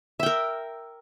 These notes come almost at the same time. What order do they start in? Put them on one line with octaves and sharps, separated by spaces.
E5 G5 A#4